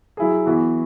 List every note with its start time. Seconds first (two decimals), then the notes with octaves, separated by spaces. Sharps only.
0.17 F#3 E4 G#4
0.46 E3 B3 F#4